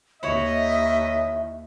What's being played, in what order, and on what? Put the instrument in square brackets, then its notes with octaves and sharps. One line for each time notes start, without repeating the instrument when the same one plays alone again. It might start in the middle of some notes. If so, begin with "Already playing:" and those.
[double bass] D#2 [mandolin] E4 C#5 [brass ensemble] D#5 [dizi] E5